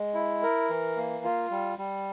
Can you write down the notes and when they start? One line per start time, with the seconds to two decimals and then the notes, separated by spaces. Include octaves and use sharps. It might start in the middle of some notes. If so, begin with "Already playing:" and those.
Already playing: G#3
0.14 E4
0.43 A#4
0.70 E3
0.97 A#3
1.25 F4
1.51 G3
1.78 G3